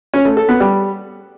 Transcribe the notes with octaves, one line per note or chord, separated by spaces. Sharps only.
C#4
A3
A4
B3
G3